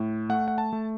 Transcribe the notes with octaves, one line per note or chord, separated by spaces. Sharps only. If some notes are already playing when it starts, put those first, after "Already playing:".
Already playing: A2
A3 F#5
F#5
A5
A3